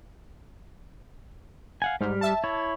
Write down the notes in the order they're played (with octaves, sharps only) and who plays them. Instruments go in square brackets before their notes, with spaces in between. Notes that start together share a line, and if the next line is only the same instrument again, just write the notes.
[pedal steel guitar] F5 F#5 G#5
[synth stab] G#2 [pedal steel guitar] G3 G4 F6
[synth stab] E5 A5
[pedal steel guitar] E4 C#5